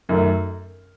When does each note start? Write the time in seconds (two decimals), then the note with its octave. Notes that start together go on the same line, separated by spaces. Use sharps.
0.09 F#2 D#3 A3